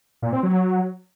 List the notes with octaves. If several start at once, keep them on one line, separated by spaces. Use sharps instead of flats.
A#2
C4
F#3